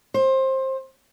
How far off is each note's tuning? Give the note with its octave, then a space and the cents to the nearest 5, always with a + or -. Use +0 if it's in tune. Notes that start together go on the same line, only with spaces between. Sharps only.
C5 +20